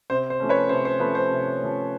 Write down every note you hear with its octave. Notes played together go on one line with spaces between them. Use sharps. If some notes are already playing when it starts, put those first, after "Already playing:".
C3 C5
C5
F3 A3 C#4
B4 C#5
C3 C5
C5
F3 A3 C#4 B4
C5
C3
F3 A3 C#4